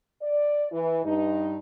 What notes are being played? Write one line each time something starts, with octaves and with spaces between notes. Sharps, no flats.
D5
E3
G2 D#4